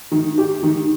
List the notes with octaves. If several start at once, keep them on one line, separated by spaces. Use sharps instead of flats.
D#3
G4
D#3